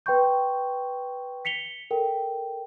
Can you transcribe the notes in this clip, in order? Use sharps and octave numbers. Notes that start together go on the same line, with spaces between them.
B4 G5 C6 C#6 G6
B6 C#7 F7 G7
A4 A#4 G5